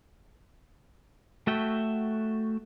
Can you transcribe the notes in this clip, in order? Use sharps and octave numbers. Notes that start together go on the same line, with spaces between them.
A3 F#4 E5 G5